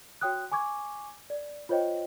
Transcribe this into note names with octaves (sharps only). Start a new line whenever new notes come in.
F#4 C#5 G5 D#6 F#6
G#5 C#6 D6 G#6
D5
F4 C5 C#5 D#5 G5